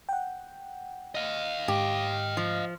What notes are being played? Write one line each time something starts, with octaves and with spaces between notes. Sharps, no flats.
F#5 G5
D#5 F5
G#2 G4
F3